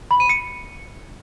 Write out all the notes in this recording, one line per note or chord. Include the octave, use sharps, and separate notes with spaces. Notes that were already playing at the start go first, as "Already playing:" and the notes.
B5
D#7
C#7